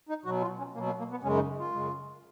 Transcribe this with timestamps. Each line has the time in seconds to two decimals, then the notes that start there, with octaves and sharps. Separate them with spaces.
0.09 D#4
0.25 B2 F#3 F#4
0.41 F4
0.58 C#4
0.74 B2 F#3 A#3
0.86 A#3
0.98 A#3
1.11 B3
1.23 F#2 C#3 G#3 C#4
1.35 D#4
1.59 F4
1.72 F#2 C#3 G#3